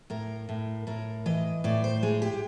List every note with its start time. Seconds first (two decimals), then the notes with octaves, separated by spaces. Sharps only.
0.10 A2 A#4
0.49 A2
0.87 A2 A#4
1.26 E3 D#5
1.64 A2 D5
1.84 C5
2.03 G#3 G#4
2.22 G4